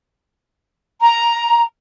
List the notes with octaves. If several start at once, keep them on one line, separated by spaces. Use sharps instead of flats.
A#5